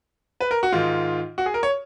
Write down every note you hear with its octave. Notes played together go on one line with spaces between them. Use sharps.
B4
A#4
F#4
G#2 D#3 F4
F#4
G#4
A#4
C#5